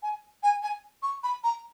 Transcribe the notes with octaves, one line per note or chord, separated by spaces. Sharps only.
G#5
G#5
G#5
C#6
B5
A#5